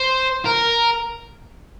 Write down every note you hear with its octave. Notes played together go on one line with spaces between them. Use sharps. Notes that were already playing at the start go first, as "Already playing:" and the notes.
Already playing: C5
A#4